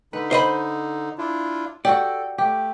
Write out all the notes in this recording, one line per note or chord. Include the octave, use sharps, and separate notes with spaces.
D3 D#4 B4
C5 D#5 B5
D4 E4 F4
F#4 G4 A4 D5
A3 G4